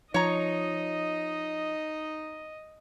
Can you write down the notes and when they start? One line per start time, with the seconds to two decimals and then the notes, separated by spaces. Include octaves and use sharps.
0.14 F3 D#4 C#5 D#5 A#5